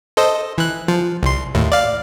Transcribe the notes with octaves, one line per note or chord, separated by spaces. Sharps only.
A4 C5 D#5
E3 F#6
F3
C2 C6
D#2 A2
D5 F5